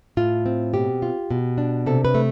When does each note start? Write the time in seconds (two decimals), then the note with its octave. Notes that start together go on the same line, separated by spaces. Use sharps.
0.17 A2 F4
0.46 C4
0.74 B2 G4
1.02 F4
1.31 B2
1.58 D4
1.86 C3 A4
2.05 B4
2.15 A3